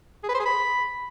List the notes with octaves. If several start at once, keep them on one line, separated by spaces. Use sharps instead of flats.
G#4
B4
C5
G#4
B5